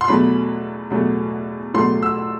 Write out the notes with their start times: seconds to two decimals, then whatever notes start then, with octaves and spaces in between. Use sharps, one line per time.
0.01 C6
0.08 E2 B2 F#3 A3 B5
0.90 E2 B2 F#3 A3
1.74 E2 B2 F#3 A3 C6
2.03 E6